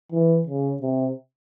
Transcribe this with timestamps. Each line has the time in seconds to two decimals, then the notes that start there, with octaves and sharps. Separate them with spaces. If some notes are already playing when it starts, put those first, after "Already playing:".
0.12 E3
0.47 C#3
0.81 C3